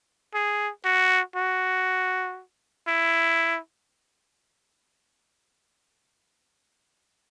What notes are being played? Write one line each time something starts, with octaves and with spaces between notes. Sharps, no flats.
G#4
F#4
F#4
E4